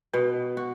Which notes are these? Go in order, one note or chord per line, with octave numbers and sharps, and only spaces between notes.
B2 B4
F#4